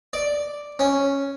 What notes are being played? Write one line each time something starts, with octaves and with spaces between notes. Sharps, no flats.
D5
C#4